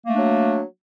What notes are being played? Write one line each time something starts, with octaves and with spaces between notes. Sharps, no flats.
F#3 A3 A#3 D4